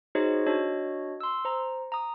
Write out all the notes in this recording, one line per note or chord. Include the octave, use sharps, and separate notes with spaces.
D#4 F#4 G#4 C5 C#5 D#5
D4 F#4 C#5 D#5
C6 E6
C5 A#5
A#5 D#6